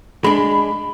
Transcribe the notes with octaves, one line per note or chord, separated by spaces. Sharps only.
G#3 D4 B5